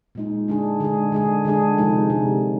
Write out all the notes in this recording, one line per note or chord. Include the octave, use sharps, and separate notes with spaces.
A#2 G#3 D#4
D3 G#3 D4 G#4
D3 G#3 D4 G#4
D3 G#3 D4 G#4
D3 G#3 D4 G#4
C3 F3 G#3 D#4
C3